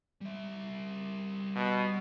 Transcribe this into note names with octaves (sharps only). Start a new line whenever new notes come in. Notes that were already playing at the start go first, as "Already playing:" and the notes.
G3 E5
B2